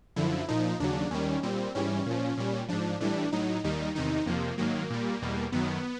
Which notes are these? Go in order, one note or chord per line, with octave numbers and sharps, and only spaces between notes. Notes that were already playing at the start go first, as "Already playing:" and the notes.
F#2 D3 F3 E4
A#2 F3 D#4
D#2 C#3 F#3 D4
D#2 D#3 G3 C#4
A#2 G3 C4
G#2 E3 G3 C#4
A#2 F3
A#2 G3
G#2 F3 D4
A2 E3 G3 D4
A2 F#3 D#4
D#2 D#3 G3 D#4
E2 C3 D#3 D#4
F2 C3 F3 A#3
G#2 D#3 F#3 A#3
A#2 G3
E2 B2 G3
F#2 D#3 F#3 B3